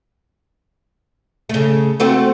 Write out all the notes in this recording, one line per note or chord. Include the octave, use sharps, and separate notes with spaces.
C#3 A3
A3 C4 F#4